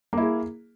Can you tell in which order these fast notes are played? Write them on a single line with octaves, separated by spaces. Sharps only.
A#3 E4 G#4